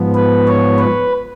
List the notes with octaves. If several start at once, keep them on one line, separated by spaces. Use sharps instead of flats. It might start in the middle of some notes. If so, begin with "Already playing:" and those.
Already playing: G#2 F3 B3
B4
C#5
B4